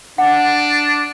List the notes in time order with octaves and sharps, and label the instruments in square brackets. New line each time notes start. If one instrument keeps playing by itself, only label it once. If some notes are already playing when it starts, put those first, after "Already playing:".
[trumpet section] D4 [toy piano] F#5